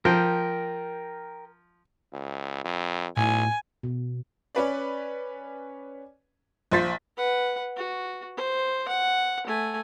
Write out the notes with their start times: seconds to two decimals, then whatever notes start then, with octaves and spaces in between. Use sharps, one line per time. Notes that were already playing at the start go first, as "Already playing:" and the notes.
0.05 F3 A#4 G5
2.13 C#2
2.64 F2
3.16 B1 A2 G#5
3.83 B2
4.55 C#4 B4 D5
6.71 A#1 F3 C5 A6 B6
7.17 B4 F#5
7.77 F#4
8.37 C5
8.88 F#5
9.47 A3 G#5